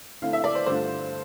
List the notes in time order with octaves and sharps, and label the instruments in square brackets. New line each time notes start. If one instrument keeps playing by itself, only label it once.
[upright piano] D3 A3 C4 E4 F5
E5
D5
C5
G2 D3 A3 D4 F4 C5